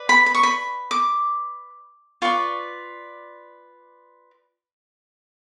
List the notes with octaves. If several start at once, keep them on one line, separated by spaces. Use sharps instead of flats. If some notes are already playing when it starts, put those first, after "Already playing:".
Already playing: B4 D5
B5
B5
C#6
B5
D6
F4 B4 D5 C#6